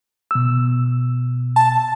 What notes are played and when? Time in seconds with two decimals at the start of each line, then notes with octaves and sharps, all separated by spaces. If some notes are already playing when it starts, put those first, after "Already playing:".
0.31 B2 E6
1.56 A5